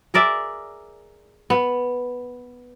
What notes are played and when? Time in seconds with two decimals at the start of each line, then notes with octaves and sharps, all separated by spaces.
0.14 G#4 A#4 D5 E5
1.50 B3